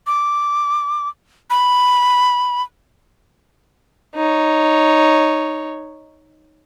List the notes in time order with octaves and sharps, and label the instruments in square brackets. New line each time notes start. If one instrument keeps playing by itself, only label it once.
[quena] D6
B5
[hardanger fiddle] D#4 C#5